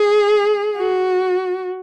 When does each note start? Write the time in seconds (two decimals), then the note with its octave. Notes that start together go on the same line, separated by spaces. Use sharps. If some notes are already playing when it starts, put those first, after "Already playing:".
Already playing: G#4
0.77 F#4